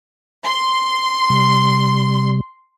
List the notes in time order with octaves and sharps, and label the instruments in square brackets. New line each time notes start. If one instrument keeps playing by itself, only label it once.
[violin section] C6
[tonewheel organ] C3 G3